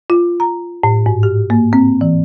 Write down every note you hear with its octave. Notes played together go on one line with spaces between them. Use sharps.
F4
A#5
A2
G#2
G4
A#3
C4
E3